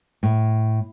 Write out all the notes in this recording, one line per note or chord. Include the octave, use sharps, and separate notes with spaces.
A2